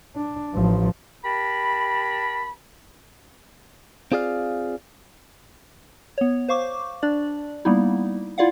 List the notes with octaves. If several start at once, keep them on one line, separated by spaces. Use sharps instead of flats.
D4
A1 F3
G4 A#4 A5 B5
C4 F4 G#4 D5 F5
B3 C#5
C5 F5 C#6 D6
D4 D5
G3 A#3 B3 D#4 E4
E4 F4 D5 F5 F#5